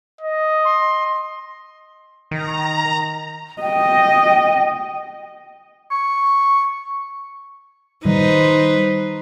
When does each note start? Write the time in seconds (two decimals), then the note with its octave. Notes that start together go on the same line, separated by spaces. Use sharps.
0.21 D#5
0.64 C6
2.31 D#3 A#5
3.62 D#5 G5
5.91 C#6
8.05 D#3 G3 D#4 B4 C5